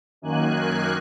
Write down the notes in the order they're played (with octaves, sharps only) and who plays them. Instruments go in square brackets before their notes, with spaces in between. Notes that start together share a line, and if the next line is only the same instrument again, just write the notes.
[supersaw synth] F#2 D#3 A#3 G#5 F#6